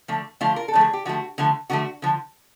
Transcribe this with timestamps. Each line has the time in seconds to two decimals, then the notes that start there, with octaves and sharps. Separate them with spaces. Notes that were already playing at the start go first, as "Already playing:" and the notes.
0.08 D3 F3 A3
0.41 D3 F3 A3 F4
0.56 A#4
0.68 A4
0.74 D3 F3 A3
0.81 G#4
0.93 G4
1.05 D3 F3 A3 F#4
1.38 D3 F3 A3
1.70 D3 F3 A3 F#4
2.02 D3 F3